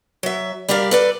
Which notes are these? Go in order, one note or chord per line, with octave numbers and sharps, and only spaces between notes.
F#3 E5
G3 G4 A#4 D5 F5
A4 B4 D5